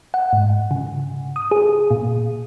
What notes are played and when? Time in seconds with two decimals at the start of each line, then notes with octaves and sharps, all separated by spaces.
0.14 F#5
0.33 G#2
0.71 C#3
1.36 D#6
1.51 G#4
1.91 A#2